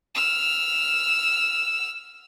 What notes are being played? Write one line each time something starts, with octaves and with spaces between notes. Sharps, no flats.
E6 F6